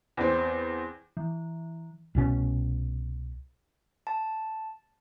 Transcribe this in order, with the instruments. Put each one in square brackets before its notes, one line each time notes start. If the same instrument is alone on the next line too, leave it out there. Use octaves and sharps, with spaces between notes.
[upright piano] E2 C4
[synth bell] E3
[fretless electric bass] C2 B2 C#4
[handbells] A5